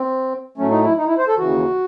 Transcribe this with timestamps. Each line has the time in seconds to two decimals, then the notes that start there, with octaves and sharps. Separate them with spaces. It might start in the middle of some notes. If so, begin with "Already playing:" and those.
Already playing: C4
0.58 A2 F#3 A3 C#4
0.71 D#4
0.84 E4
0.98 D#4
1.07 E4
1.18 C5
1.28 A4
1.38 D#2 C#3 E3 F#4